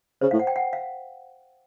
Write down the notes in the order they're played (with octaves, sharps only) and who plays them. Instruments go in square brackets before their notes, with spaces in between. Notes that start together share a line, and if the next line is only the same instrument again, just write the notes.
[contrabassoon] C#3 [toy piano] C5
[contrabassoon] A2 [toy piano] F5
[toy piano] F#5
G5
F#5
F5